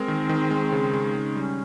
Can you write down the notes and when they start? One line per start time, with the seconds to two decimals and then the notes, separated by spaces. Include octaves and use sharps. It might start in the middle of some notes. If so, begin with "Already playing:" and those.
Already playing: G#3 C4 A#4
0.08 D#3
0.29 D#3
0.51 G#3
0.72 C#3
0.93 G#3
1.15 C#3
1.36 G3 C#4